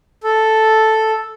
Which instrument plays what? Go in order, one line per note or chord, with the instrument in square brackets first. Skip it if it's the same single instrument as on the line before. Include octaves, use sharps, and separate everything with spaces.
[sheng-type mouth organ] A4